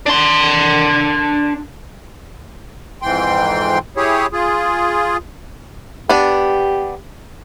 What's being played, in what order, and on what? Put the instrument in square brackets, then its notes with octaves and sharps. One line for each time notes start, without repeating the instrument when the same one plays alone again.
[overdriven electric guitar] D4 C6
[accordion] F2 G#2 E3 G5 C6
E4 G4 G#4 C#5
F4 G#4
[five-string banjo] B3 D4 [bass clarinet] G4